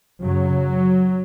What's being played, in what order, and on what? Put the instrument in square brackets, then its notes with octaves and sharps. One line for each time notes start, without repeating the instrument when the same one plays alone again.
[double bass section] F#2 C#3 F#3